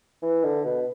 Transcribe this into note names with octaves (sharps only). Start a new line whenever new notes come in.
E3
D3
B2